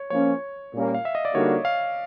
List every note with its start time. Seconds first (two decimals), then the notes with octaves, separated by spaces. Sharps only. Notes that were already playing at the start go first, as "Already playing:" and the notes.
Already playing: C#5
0.10 F3 A#3 C#4 C#5
0.73 A#2 G3 A#3 C#4
0.94 F5
1.05 E5
1.15 D#5
1.25 D5
1.34 D3 G3 A#3 D#4 F#4 C#5
1.65 F5